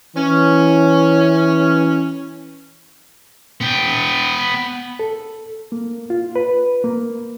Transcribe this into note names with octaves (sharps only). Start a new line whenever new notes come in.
E3 C#4
B3 G5
A4
A#3
F4
B4
A#3